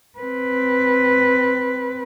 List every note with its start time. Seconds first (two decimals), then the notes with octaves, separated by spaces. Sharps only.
0.19 C4 B4